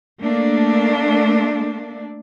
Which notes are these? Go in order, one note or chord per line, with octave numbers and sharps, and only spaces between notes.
A3 A#3 D4